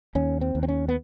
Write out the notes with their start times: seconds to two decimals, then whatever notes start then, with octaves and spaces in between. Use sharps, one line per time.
0.15 D#2 C#4
0.41 C4
0.55 D#2
0.63 C4
0.68 C#4
0.89 B3